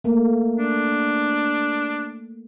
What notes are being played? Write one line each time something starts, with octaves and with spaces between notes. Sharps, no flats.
A3 A#3
D4